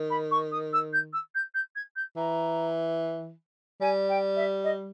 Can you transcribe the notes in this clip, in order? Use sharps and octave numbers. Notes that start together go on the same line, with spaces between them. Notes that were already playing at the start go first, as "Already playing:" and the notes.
Already playing: D#3
B5
C#6
D#6
E6
G6
E6
G6
G6
G#6
G6
E3 A#5
G3 G#5
G5
E5
D#5